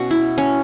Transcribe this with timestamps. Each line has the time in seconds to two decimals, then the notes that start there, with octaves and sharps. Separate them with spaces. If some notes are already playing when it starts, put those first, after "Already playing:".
Already playing: B2 C#4 F#4
0.11 E4
0.38 C#4